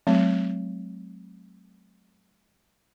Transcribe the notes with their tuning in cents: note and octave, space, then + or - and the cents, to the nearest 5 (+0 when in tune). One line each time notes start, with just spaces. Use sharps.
F#3 +0 A3 -40 C4 +0